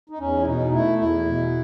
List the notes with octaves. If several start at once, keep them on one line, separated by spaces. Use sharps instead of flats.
D#4
E2 C#4
E4
B2 D#4
A3 E4
E2 E4
B2